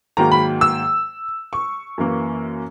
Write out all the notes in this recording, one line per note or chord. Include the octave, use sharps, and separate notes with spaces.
G#2 D#3 F#3 A#3 A#5
B5
E6
C#6
F#2 E3 A#3